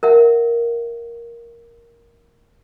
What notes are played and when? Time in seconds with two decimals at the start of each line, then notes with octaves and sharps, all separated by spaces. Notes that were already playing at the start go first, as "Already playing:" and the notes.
0.03 A#4 E5 F#5